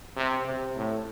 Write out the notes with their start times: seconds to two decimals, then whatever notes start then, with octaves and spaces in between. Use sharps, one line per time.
0.17 C3
0.45 C3
0.76 A2